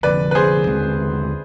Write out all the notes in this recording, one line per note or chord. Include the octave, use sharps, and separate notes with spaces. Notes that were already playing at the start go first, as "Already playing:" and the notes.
F1 F2 D3 B4 D5
B4
G#4 C5
D#2 D3 G#3 C4